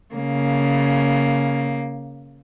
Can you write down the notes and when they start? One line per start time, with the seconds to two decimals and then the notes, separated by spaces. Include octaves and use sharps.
0.15 C#3 A#3